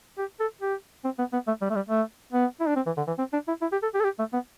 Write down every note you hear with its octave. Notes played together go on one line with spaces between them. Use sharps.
G4
A4
G4
C4
B3
B3
A3
G3
A3
G3
A3
B3
E4
D4
C4
E3
D3
E3
C4
D4
E4
E4
G4
A4
G4
A4
G4
A3
B3